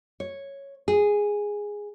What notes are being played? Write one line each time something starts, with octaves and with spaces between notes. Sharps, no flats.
C#5
G#4